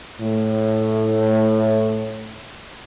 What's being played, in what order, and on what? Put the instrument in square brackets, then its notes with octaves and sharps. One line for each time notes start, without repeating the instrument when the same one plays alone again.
[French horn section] A2 A3